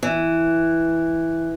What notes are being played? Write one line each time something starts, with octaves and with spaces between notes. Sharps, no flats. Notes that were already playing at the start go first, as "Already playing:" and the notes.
E3